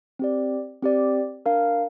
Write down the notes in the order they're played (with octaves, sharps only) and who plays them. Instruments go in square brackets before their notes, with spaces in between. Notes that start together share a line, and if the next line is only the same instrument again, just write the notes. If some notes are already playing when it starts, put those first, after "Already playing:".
[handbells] C4 G4 D5
C4 G4 D5
D4 A#4 F5